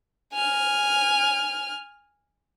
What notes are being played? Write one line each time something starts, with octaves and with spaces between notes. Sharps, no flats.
G#5 F6